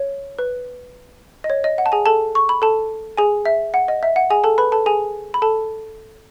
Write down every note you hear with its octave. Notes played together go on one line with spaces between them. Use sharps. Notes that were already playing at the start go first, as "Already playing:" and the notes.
Already playing: C#5
B4
D#5
C#5
D#5
F#5
A5
G#4 G#5
A4 A5
C#6
B5
A4 A5
G#4 G#5
E5
F#5
D#5
E5
F#5
G#4 G#5
A4 A5
B4 B5
A4 A5
G#4 G#5
B5
A4 A5